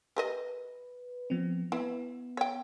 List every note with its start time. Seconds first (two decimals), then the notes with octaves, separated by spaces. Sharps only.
0.17 G4 A#4 B4 D#5
1.30 F3 B3 C4
1.72 B3 E4
2.37 C#5 G5